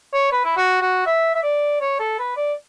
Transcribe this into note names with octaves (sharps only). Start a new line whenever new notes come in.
C#5
B4
E4
F#4
F#4
E5
E5
D5
C#5
A4
B4
D5